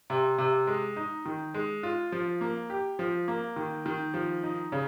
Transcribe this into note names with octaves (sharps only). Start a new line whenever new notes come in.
C3
C3
G#3
D#4
D#3
G#3
F4
F3
A#3
G4
F3
A#3
D#3
D#3
F3
D#4
C#3